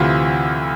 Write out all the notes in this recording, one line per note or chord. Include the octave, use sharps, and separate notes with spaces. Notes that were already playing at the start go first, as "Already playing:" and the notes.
Already playing: D2 C3 E3 F4